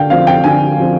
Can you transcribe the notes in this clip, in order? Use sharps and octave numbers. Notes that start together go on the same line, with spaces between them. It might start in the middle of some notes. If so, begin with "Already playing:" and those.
Already playing: D3 F5 G5
F3 C4 F5
G5
D3 G#5
F3 C4